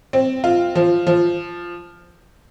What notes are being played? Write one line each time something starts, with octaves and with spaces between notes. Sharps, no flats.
C4
F4
F3
F3